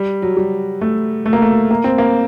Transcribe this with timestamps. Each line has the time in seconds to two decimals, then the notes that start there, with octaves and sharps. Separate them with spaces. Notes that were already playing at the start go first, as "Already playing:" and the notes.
Already playing: G3
0.22 F#3
0.37 G3
0.81 A3
1.26 A3
1.33 A#3
1.42 A3
1.71 A#3
1.84 C4
1.98 A#3